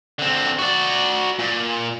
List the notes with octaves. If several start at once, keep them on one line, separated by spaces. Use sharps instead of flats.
D3 C4
F#4 D5
A#2